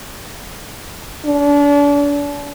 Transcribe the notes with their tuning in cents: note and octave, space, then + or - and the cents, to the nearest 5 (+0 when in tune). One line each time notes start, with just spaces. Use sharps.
D4 -35